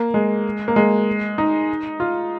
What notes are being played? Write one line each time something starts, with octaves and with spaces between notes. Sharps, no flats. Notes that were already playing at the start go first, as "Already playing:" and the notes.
Already playing: A#3
G#3
A#3
G#3
D#4
F4